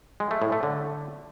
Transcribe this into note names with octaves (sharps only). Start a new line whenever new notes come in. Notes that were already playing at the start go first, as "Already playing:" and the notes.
G#3
A3
A2
A3
D3